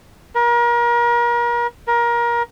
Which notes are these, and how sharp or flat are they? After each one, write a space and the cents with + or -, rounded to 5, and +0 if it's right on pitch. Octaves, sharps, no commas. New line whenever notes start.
A#4 +35
A#4 +25